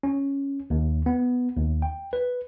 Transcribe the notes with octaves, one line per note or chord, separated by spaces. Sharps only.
C#4
D#2
B3
D#2
G5
B4